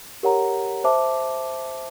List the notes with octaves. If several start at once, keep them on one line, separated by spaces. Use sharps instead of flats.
G4 A#4 C#5 F#5 A#5
C5 E5 A5 D6